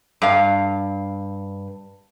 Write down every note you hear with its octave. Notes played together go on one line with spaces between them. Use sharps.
G2 F5